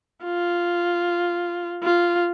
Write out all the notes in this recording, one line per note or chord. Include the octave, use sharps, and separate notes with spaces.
F4
F4